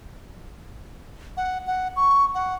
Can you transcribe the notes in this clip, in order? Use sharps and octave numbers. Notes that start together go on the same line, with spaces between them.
F#5
F#5
C#6
F#5